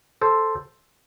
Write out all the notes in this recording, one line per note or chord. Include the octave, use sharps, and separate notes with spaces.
A4 C5